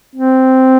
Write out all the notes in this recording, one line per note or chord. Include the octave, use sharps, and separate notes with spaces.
C4